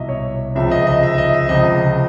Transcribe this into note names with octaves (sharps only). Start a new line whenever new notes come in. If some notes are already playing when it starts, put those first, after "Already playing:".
Already playing: C2 B2 F#3 D#5 E5
C#5
C#2 C3 F3 E5
D#5
E5
D#5
E5
E5
D#5
E5
C#2 C3 F3 D#5